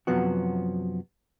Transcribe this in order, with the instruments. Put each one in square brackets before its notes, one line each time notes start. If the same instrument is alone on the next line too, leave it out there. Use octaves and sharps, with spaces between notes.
[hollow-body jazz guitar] F#2 C3 F3 F#3 B3 F#4